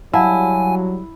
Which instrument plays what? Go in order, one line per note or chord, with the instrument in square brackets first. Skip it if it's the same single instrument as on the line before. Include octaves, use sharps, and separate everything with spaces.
[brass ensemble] F#3 G3 [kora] E4 [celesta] F5 F#5 A5 [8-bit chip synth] G#5